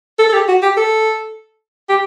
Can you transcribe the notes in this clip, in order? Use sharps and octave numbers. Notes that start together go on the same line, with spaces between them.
A4
A4
G4
F#4
G4
A4
G4